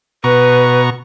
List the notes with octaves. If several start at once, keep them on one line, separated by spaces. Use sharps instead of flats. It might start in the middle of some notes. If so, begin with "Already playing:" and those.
B2 B4 A#5 C#6